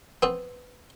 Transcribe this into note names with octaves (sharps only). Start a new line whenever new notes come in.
B3 C4